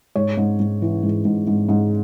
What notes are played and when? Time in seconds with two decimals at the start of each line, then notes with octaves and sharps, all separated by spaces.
0.15 G#2 C#5
0.37 G#2
0.59 G#2
0.82 E3
1.03 G#2
1.25 G#2
1.47 G#2
1.69 G#2